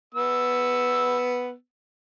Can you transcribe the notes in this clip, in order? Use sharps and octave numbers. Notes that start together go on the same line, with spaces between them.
B3 E6